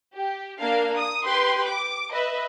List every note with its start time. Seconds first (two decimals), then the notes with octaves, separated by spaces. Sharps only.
0.15 G4
0.60 A#3 D4 F5
0.99 D#6
1.27 G4 B4 G5 C6
1.68 D6
2.12 B4 D#5 E5